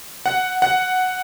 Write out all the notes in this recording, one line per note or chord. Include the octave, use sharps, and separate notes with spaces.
F#5
F#5